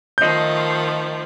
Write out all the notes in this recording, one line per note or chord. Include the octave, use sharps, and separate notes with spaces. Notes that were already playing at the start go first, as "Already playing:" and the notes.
D#3 F3 A3 D#5 G6